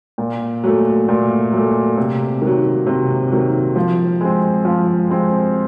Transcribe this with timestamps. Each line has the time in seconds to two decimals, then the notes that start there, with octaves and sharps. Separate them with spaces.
0.18 A#2
0.64 F#3 A3
1.09 A#2
1.52 F#3 A3
1.97 C3
2.42 D#3 F#3
2.87 C3
3.31 D#3 F#3
3.76 F3
4.21 G#3 C4
4.65 F3
5.10 G#3 C4